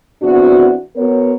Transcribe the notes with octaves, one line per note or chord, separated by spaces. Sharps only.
E2 C4 D4 F#4
B3 F#4 A#4 C#5